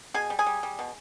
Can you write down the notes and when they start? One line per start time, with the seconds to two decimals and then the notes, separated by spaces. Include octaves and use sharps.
0.14 B2 G#4 G#5
0.30 G3
0.39 G#4 G#5
0.46 G3
0.63 G3
0.79 B2